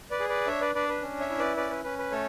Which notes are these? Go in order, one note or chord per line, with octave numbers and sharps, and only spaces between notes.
B4 D5
G#4
B4 D5
D4 C#5 E5
B4 D5
D4 B4 D5
B4
C#4
C#5 E5
E4
B4 D5
C#4 B4 D5
B4
C#4 B4
B4
A3 A4 C#5